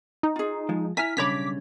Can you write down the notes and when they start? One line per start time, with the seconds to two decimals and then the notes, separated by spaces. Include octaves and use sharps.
0.23 D#4
0.36 F4 G#4
0.69 F3 G#3
0.97 E4 E5 G#5 A#5 F6 B6
1.17 B1 C#3 G3 D4 C#5 B5 D6 B6